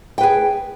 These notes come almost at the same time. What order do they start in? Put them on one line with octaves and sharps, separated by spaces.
G5 B4 G#4